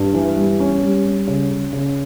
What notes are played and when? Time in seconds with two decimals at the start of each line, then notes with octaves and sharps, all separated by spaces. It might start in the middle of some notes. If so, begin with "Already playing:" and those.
Already playing: G2
0.14 E3
0.37 G3
0.60 C#4
0.82 G3
1.05 G3
1.27 C#3
1.51 C#3
1.73 C#3